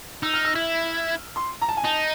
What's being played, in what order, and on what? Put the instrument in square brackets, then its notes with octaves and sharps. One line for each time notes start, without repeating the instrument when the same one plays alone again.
[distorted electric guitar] D#4 [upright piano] E6
[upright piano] F6
E6
[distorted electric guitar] E4
[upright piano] C6
A#5
A5
G#5
[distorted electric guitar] D#4 [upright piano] A5